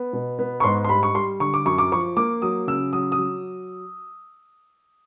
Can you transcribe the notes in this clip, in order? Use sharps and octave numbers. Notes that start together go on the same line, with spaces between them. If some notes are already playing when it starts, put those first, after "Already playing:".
Already playing: B3
B2
B3
C#6
G#2 C6
C6
G3 B5
C#6
G3 C6
D3 C#6
D6
F#2 C#6
D6
F3 C#6
A#3 D6
F#3 D#6
C#3 E6
F#3 D#6
D#6
F#3